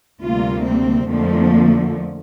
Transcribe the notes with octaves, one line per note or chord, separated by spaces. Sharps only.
D2 C3 G3 A#3 F4
C4
F2 D3 F3 A3 A#3